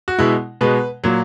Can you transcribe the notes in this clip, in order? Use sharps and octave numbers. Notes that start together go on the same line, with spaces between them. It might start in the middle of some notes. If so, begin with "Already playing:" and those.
F#4
B2 G#3 E4
B2 G#3 B4
A#2 F#3